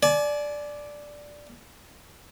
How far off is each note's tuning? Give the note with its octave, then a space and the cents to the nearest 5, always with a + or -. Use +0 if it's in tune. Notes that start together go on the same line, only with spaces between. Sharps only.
D5 +0 G#5 +40